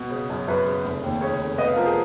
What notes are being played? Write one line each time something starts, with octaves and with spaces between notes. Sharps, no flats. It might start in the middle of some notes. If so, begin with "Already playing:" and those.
Already playing: B2
C#3
F#2
F#2 B4
C#3
F1
D#2
C#3 C#5
F1
B3 D#5
F5
F3 A#4
G#4